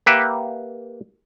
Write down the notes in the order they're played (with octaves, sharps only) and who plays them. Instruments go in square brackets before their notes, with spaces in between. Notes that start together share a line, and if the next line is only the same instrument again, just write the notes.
[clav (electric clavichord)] A#3 G4 B4 E5 F#5 G5